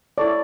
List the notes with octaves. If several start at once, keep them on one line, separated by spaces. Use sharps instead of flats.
E4 A4 C#5 D5